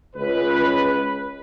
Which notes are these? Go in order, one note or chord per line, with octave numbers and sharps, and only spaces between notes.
C#2 B4